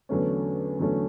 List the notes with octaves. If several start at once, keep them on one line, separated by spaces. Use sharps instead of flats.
E2 D3 F#3 A3 C#4
E2 D3 F#3 A3 C#4